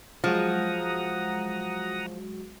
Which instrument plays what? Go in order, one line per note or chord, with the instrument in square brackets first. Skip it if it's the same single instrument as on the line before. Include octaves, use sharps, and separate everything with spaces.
[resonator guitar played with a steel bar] F3 [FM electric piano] F#3 G#3 F#4 [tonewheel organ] F#5 A#5 D#6